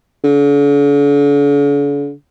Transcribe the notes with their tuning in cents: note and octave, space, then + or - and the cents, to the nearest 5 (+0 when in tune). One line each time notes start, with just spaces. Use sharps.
D3 -45